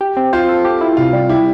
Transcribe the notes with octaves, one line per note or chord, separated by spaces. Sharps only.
G4
C4
F4 C5
A4
G4
E4
C3 F4
G3
E4 G4